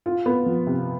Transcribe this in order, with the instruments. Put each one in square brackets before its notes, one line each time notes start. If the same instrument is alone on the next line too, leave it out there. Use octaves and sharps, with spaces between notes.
[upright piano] F4
B3
F3
C3